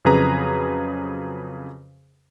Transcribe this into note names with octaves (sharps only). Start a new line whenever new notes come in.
F2 C#3 F#3 G#4 B4 A#5